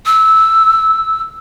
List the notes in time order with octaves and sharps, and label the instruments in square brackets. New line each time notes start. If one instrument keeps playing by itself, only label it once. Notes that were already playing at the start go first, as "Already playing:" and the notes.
[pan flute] E6